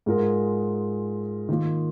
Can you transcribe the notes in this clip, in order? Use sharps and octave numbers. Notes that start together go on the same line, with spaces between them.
G#2 G#3 F4 A#4
D#3 A#3 F4